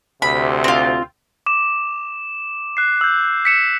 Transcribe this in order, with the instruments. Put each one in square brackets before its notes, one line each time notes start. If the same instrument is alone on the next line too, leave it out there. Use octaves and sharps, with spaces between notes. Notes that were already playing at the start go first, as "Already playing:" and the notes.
[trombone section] D2 C3 [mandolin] B5
[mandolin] C4 F4
[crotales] D6 E7
F#6 C7
E6 G6
B6 C#7 E7